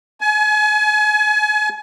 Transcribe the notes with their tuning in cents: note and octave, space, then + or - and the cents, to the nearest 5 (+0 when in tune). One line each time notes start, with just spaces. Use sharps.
G#5 +35